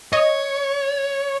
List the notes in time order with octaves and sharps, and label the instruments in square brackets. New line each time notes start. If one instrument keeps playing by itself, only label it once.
[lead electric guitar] C#5 [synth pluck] D#5